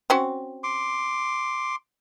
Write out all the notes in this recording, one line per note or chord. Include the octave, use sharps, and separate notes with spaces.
C4 C#4 F#4
C6 D6